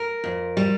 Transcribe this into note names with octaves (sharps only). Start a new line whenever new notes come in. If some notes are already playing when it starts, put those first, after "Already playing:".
Already playing: A#4
F2
G3